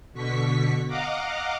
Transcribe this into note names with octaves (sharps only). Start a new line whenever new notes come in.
B2 D3 C#6 B6
D#5 F5 F#5 A#5 D6